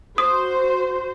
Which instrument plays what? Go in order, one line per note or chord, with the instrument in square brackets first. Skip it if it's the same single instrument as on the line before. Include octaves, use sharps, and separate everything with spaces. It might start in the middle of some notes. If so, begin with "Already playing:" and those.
[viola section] F#4 C5 [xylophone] D#6